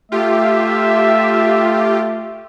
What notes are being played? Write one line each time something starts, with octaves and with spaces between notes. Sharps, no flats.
A3 F4 G4 E5